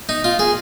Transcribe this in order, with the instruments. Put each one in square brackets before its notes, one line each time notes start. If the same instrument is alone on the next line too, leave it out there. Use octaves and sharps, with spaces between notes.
[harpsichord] D#4
F4
G#4